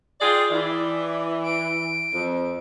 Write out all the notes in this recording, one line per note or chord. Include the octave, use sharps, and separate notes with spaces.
F4 G#4 D5 G5
E3 D5
D7
F2